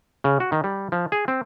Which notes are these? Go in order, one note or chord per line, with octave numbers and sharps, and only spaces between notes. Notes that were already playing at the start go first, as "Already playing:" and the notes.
C#3
F#4
D#3
G3
F3
G#4
C4